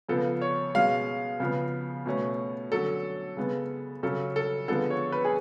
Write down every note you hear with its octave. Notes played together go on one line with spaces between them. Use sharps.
C#3 F3 B3 A4
C#5
B2 G#3 C#4 F5
C#3 F3 B3
B2 A3 C#4
D3 F#3 C#4 A4
C#3 G#3 B3
C#3 F#3 C#4 A4
A4
D3 F3 G#3 B3 A4
C#5
B4
G#4